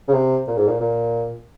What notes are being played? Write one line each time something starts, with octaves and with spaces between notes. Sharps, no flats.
C#3
C3
A#2
G#2
A#2
A#2